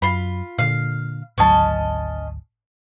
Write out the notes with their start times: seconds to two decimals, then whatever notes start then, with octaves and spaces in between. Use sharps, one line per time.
0.02 F#2 F4 B5
0.58 A#2 D3 F5
1.38 G#1 D2 F#3 C#4 D#5 A5